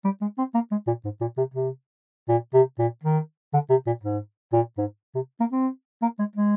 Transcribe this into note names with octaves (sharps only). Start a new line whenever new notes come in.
G3
G#3
C4
A#3
G#3
A#2
G#2
A#2
C3
C3
A#2
C3
A#2
D#3
D3
C3
A#2
G#2
A#2
G#2
C3
A#3
C4
A#3
G#3
G#3